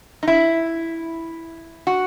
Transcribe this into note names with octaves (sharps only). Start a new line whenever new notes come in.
D#4
E4
F#4